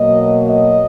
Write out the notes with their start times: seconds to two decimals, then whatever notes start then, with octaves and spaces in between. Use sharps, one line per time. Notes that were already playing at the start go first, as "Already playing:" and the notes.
Already playing: B2 F#3 A#3 D#5
0.51 D#5